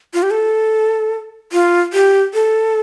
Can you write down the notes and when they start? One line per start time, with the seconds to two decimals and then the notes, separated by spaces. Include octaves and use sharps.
0.14 F4
0.23 G4
0.31 A4
1.53 F4
1.93 G4
2.34 A4